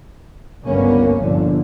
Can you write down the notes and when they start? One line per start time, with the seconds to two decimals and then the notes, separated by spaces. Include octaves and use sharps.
0.64 G1 C#2 G2 A#3 B3 C#4
1.18 G1 C2 F2 A#2 D3